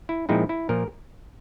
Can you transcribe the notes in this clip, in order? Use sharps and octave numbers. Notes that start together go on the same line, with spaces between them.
E4
A#2 F3 G#3 C4 D#4 E4
E4
A#2 F3 A#4